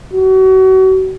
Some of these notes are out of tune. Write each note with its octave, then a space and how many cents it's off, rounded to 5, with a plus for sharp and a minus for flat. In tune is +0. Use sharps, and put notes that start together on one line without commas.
F#4 +35